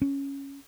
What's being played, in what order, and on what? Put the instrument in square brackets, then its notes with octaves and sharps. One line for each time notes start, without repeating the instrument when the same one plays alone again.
[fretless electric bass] C#4